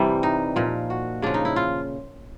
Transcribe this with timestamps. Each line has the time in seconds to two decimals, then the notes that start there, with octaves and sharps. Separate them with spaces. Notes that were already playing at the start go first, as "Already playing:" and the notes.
Already playing: C3 E3 G3
0.23 D#4
0.56 A#2 F3
0.90 F#4
1.22 C#3 F3 D4
1.34 D#4
1.45 E4
1.56 F4